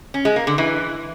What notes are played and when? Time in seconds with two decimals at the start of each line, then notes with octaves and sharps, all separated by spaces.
0.14 C#4
0.25 G#3
0.36 A#3
0.47 D3
0.58 E3